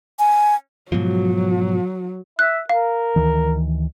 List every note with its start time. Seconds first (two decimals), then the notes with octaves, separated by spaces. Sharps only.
0.19 G#5
0.92 G#2 B2 F3 F#3
2.39 E5 F#6
2.69 A#4 F5
3.16 D2 D#3 E3